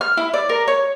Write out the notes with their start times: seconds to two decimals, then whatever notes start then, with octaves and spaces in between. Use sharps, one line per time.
0.01 F6
0.17 E4
0.34 D5
0.49 A#4
0.68 C#5